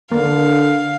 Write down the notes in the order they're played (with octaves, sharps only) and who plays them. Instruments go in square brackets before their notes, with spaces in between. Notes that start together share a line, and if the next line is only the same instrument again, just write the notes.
[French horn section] D3 [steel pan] A#3 [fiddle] F5